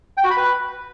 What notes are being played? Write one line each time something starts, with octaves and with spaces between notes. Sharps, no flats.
G5
F#4
B5
B4